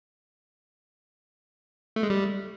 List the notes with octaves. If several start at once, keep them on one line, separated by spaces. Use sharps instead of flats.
A3
G#3
G3